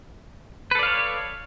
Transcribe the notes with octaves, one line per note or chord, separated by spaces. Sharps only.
A4 B4 C#5 D5 F5